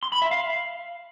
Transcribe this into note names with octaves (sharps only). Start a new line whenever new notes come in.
C6
B5
E5
F5